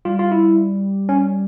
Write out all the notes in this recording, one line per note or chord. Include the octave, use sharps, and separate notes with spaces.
G3 F4
F4
E4
C#4